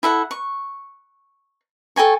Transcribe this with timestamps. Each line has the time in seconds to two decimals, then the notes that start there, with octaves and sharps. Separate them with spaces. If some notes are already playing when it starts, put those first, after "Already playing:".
0.03 E4 A4 F#5
0.31 C#6
1.96 A4 G5 G#5 C#6